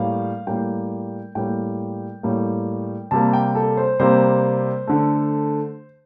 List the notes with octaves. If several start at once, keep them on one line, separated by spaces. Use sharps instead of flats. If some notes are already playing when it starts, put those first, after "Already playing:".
Already playing: A2 G3 A#3 F5
A2 G3 A#3 G5
A2 G3 A#3 G5
A2 G3 A#3
C3 G3 A#3 A5
G5
A4
C5
C3 G3 A#3 C5
D3 A3